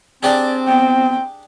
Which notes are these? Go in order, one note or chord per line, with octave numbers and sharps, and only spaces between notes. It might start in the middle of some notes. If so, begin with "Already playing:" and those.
C4 D4 G4 G#4 D5
B3 G5